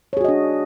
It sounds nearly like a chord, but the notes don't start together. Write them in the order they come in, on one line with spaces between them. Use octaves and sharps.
C#5 G#4 F#4 D#5 D4